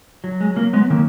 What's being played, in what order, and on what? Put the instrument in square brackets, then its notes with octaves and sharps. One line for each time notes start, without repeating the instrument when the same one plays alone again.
[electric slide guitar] F#3
G#3
F#3 A#3
G#3 B3
D#3 A#3